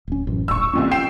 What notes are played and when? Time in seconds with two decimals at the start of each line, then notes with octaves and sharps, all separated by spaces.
0.08 D1 C#4
0.27 A1 F#2
0.48 D#1 A#1 C#6 E6
0.73 C2 F2 A#2 C#4
0.91 G5 C7 E7